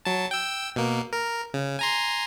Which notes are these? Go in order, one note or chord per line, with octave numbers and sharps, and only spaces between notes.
F#3 A5
G5 E6
B2 A#3
A#4
C#3
G#5 A#5 C6